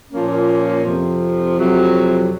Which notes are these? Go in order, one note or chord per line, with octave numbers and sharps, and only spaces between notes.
A#2 F3 A#3 C#4
F2 C3 F3
F2 C3 F#3